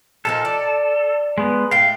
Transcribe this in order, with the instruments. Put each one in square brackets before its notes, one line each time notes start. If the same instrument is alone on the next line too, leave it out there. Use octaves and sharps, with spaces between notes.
[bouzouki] A#2 F3 D#4 [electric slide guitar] A4
[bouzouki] D5
[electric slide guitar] G#3 B3
[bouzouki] A2 G5 [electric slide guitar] F5